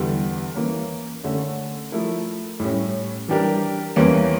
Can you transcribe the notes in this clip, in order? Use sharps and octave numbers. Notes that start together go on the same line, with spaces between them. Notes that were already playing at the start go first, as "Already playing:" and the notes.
Already playing: E2 D3 G3
E3 A#3 C#4
D3 A3 C#4
F3 A3 E4 A#4
A2 G3 C#4
E3 G3 D4 G4 A#4
E2 E3 G3 A#3 C#4